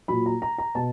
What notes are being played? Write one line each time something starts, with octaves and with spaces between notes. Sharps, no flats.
A#2 F#3 B5
A#5
A#5
A#5
B2 A5